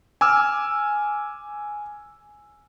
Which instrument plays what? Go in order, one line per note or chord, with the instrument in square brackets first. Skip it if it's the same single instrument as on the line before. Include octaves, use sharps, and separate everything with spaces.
[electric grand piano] G#5 D6 E6 F6